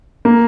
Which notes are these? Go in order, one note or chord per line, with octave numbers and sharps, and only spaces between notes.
A#3